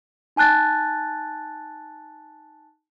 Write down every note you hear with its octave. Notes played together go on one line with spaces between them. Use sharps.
D#4 G#5 A5 F#6 A6